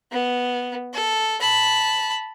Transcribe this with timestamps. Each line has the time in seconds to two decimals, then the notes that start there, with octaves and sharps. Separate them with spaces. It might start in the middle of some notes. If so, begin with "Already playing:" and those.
0.12 B3
0.94 A4
1.41 A5 B5